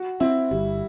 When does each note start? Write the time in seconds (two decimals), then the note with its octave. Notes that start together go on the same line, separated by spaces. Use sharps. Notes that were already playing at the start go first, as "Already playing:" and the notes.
Already playing: F#4
0.20 C4 E4
0.51 G1 G3